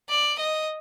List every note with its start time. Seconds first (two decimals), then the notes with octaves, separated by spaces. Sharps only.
0.09 D5
0.39 D#5